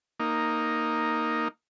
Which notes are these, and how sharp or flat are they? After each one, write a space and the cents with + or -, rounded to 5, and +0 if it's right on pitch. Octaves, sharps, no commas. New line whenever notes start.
A#3 +0 D#4 +0